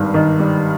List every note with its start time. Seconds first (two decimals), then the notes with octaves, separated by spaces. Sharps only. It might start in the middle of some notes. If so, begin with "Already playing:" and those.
Already playing: G#1 G2 G3
0.14 D#3
0.40 G3